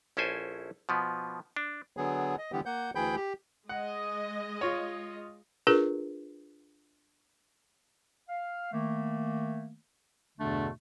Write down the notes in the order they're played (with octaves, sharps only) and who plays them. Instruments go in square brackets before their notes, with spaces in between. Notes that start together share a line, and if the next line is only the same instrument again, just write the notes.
[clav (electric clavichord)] A#1 C#4 E4 A4 C5 G#5
B2 F3 B3
D4
[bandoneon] D3 F#3 B3 G#4
D#5
D3 E3 G3 B3 G4
A#3 F#5 G6
D2 E3 G#4 G5 B5 G6
G4
[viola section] G#3 D#5 [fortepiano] F#5
[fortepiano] F4 C#5
[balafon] D4 F4 G#4 A#4 B4
[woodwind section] F5
D#3 A3 A#3
E2 G2 B2 D3 A3 D4